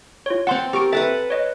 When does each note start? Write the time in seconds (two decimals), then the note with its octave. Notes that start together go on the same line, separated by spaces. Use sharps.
0.26 F4 C#5
0.47 C4 F#5 A5 C6
0.73 G4 A#4 C#6 D7
0.92 A4 B4 E5 F#5 A5 A6
1.30 C#5 D#5